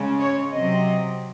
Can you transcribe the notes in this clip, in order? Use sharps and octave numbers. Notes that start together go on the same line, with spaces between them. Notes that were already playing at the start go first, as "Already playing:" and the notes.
Already playing: C#3 G#3 C#4
C#5
C3 F#3 C4 D#5